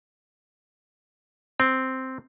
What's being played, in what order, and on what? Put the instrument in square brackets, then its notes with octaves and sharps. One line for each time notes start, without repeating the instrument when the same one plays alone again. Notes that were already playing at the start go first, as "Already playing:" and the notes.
[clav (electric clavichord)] C4